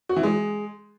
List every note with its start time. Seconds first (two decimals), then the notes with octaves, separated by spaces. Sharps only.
0.09 F#4
0.16 E3
0.23 G#3